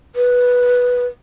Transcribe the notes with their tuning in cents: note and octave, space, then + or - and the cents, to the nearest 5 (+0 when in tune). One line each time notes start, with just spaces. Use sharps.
B4 -5